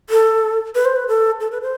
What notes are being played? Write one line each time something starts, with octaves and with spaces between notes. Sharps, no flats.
A4
B4
C5
B4
A4
A4
B4
C5